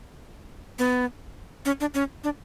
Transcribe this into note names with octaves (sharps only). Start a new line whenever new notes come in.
B3
C#4
D4
C#4
D4